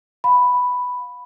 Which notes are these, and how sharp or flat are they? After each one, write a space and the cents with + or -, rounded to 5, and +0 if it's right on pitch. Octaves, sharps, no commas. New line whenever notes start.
F5 +35 B5 +0